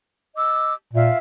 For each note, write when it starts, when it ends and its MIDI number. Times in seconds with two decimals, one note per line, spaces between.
0.35 0.72 75
0.35 0.72 86
0.35 0.72 88
0.94 1.10 46
0.94 1.16 65
0.94 1.16 76
0.94 1.16 77